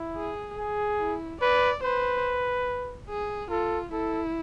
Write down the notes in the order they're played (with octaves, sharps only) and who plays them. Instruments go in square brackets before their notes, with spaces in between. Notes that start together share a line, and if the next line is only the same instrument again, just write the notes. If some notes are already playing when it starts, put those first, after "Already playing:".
Already playing: [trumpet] E4
[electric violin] G#4
[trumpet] G#4
[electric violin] E4
[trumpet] B4 [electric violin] D5
[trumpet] B4 [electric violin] C5
[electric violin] G#4
[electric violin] F4 [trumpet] A4
[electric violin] E4 [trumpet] A4